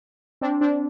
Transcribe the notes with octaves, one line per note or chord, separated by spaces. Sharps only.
C4 D4
C4 D4